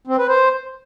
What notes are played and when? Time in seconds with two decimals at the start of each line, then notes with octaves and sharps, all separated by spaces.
0.07 C4
0.18 B4
0.28 C5